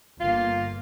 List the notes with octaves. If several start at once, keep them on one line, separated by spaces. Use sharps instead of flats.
G1 A#3 F4